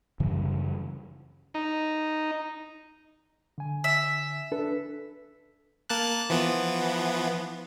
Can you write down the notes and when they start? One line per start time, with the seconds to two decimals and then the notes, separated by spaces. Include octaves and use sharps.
0.20 F#2 C#3 E3 G3
1.54 D#4
3.58 D3 G#5
3.84 E5
4.52 D4 A4 B4
5.89 A#3 A5 F#6
6.30 E3 F3 B3